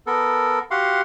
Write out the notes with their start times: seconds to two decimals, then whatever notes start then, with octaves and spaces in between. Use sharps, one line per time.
0.07 B3 A4 A#4
0.71 F#4 G4 F5 F#5 C6